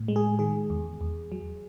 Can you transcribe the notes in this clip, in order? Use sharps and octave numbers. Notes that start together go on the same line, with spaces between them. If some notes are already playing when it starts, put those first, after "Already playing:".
Already playing: A2
G#3
G#4
D#3 G#4
E2
E2
F#3